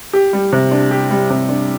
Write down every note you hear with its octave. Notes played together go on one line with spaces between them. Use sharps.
G4
G3
C3
D4
G4
G3
C3
D4